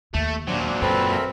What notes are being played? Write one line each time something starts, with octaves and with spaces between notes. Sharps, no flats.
D#2 A3
A#2 F#3 D4 C5
F#2 C4 A4 B4 A5
A4 A#4 E5